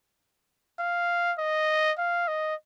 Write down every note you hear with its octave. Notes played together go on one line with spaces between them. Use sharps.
F5
D#5
F5
D#5